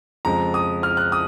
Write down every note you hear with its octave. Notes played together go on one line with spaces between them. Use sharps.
F2 C#3 F3 G#3 A#5
D#6
F6
F#6
D#6